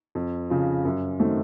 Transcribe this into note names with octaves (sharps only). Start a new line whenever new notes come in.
F2
C#3 F3
F#2
D#3 A3 C4 F#4